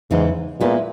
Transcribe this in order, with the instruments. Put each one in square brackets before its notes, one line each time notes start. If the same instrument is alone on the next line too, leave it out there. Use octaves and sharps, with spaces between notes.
[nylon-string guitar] E2 C#3 E3 G#3 D#4 [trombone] G#2
[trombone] A#2 [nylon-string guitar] G#3 B3 E4 B4